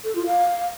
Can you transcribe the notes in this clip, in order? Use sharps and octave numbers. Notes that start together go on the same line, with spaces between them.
A4
F4
F5